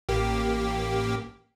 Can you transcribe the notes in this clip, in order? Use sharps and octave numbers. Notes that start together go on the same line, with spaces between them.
A1 A#3 G4